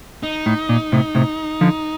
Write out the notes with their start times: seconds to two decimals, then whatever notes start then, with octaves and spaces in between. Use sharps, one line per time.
0.23 D#4
0.46 A2
0.69 A#2
0.92 A2 C3
1.15 A2 C3
1.61 D3 F3